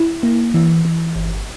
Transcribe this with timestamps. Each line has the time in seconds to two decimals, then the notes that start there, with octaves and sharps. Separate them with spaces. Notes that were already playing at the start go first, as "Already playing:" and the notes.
Already playing: E4
0.23 A#3
0.54 E3
0.85 E3
1.16 G1